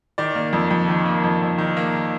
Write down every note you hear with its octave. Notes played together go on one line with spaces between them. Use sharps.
D#3 D5
A#3
F2
F2
D#3
A#3
F2
F2
D#3
A#3